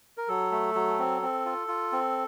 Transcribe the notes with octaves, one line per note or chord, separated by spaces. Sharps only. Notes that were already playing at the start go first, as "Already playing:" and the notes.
A#4
F#3 A4
A3
F#3
C4
C4
F4
F4
C4